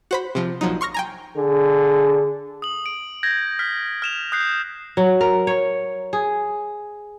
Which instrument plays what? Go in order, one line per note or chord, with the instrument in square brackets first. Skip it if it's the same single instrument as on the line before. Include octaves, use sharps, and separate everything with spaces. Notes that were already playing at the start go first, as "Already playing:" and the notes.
[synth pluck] F#4 C5 B5
C3 F3
A#1 F3 F#3 D#4
C6 C#6 F6 A#6
G5 G#5 A#5
[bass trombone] D3 [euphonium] G#4
[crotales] D#6 F#7
D7
G6 G#6 A#6
F6 B6
F6 E7 F7
D#6 F#6 G6 C7
[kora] F#3
A#4
C#5
G#4